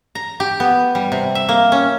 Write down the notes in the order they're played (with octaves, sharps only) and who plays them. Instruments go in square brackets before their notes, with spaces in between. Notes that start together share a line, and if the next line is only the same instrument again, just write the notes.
[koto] A#5
G4
B3
G3
C3
E5
A#3
C#4